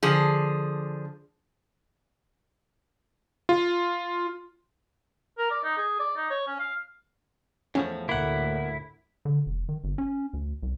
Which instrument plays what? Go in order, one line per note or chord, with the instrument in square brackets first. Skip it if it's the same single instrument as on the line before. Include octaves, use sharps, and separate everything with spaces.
[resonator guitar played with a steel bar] D3 F3 G#4
[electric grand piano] F4
[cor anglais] A#4
D5
D#4
G#4
D5
D#4
C#5
C#4
F5
[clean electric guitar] E2 A2 F3 [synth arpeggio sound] C#4
[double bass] D2 A2 [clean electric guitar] A#3 F#5 [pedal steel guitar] E4
[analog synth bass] D3
F1
D#3
G1
C#4
D2
C2